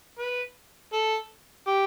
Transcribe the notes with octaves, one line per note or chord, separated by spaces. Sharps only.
B4
A4
G4